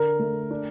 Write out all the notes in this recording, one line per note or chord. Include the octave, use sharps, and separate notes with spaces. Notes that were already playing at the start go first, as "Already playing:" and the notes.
Already playing: D3 A#4
A3
D4